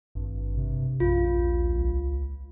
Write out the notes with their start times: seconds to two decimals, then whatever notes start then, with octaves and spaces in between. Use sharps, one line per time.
0.15 G#1 G2
0.57 C3
1.00 A#1 F#2 F4
1.24 D#2
1.72 C#2